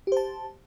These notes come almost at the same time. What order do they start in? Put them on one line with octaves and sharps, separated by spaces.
G4 C5 A5